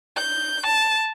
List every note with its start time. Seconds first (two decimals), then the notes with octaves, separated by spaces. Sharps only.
0.16 G6
0.65 A5